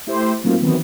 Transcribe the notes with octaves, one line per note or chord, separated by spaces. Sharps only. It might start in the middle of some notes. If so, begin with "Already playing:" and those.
A3 E4 G4 C5
A2 F#3 A#3 C4 D#4 F4
D#3 E3 F#3 B3 C4